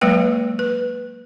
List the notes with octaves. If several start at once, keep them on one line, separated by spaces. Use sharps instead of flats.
F#3 G#3 A#3 B4 G5
B4